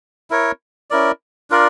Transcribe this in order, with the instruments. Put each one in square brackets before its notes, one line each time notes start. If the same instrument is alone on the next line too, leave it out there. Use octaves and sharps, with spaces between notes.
[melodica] E4 A#4 C#5
C#4 E4 A#4 D5
D4 F4 A#4 D5